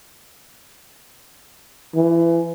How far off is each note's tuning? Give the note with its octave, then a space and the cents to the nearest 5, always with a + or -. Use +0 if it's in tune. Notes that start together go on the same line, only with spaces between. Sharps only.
E3 +25